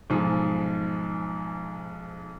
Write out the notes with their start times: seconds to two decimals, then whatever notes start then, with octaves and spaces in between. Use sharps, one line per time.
0.10 B1 G#2 F3 G#4